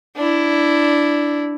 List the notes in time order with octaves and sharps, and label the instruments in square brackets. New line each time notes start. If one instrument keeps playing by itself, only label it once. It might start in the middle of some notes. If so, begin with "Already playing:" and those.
[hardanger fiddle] D4 E4